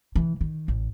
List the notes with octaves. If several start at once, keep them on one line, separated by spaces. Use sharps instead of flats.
E3
D#3
A1